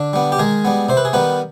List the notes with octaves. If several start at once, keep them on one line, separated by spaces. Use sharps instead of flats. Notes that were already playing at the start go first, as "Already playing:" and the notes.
Already playing: D3 D4
G3 B3
G4
D#3 G#3 G#4
G3 B3
C3 C5
B4
G#4
D#3 G3 B3 B4